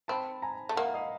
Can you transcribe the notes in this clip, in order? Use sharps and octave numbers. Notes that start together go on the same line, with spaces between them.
C4 A5 B5
G#5 A#5
A3
A#3 E5 F#5
D#5 F5